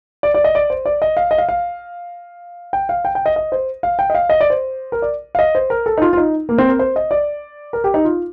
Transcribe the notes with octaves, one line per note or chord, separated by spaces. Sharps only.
D5
D5
D#5
D5
C5
D5
D#5
F5
D#5
F5
F5
G5
F5
G5
G5
D#5
D#5
C5
F5
G5
D#5
F5
D#5
D5
C5
A#4
D5
F5
D#5
C5
A#4
A4
D#4
F4
F4
D#4
A#3
C4
A#4
C5
D#5
D5
A#4
G4
D#4
F4